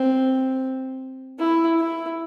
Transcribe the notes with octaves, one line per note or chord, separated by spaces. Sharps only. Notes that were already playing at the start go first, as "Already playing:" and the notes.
Already playing: C4
E4
E4